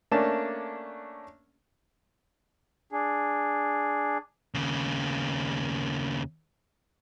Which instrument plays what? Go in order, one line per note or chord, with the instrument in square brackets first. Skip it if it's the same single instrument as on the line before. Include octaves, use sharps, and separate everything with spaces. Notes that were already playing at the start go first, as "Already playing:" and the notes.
[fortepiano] A3 A#3 C#4 D4 A5
[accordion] D4 G#4
[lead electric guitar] D#2 C#3